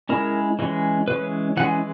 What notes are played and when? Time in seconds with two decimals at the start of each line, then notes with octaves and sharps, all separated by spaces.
0.09 G#3 C#4 E4 A#4
0.59 E3 G#3 C#4
1.08 E3 G#3 C#4 B4
1.57 E3 G#3 C#4 F#5